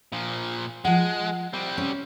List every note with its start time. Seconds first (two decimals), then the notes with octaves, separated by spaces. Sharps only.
0.12 A#2 F3
0.85 F3 G#3 F#5
1.53 G3 C4
1.78 C#4